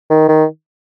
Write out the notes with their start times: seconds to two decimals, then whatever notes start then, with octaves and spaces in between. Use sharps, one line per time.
0.10 D#3
0.28 D#3